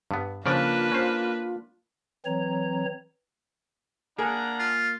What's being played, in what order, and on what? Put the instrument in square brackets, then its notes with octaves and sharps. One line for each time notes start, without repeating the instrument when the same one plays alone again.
[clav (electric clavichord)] G2 B3
[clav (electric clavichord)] C#3 F3 D5 [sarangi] A#3 [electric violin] D4 B4 [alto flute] F4
[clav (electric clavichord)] C#4 C5
[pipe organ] E3 F#3 C4 C#5 A#5
[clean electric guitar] A#3 [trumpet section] D4 F#5 A#5 [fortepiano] G#4
[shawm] F4